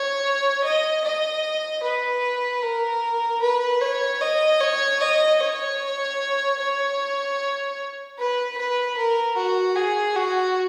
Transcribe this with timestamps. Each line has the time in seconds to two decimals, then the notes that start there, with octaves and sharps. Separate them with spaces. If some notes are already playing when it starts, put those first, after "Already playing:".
Already playing: C#5
0.64 D#5
1.04 D#5
1.83 B4
2.62 A#4
3.42 B4
3.81 C#5
4.21 D#5
4.61 C#5
5.01 D#5
5.40 C#5
6.59 C#5
8.18 B4
8.58 B4
8.97 A#4
9.37 F#4
9.76 G#4
10.16 F#4